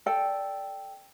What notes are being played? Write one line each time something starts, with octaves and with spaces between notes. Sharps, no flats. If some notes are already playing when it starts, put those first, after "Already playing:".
A4 D5 G5